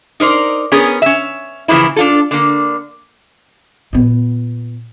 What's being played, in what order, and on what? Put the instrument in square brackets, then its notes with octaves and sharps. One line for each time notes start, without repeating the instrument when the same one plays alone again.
[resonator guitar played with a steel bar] D#4 A#4 C5 D5
B3 C#4 G#4 A#4
C#4 E5
A#2 C#3 E3 F3 E4
D4 F4 A4
D3 A#3
[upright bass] A#2 B3